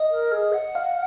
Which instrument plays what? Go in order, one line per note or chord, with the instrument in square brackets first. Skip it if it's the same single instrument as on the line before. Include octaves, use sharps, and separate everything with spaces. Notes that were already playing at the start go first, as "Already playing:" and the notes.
Already playing: [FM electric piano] D#5
[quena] A#4
G#4
F#5
[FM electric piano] F5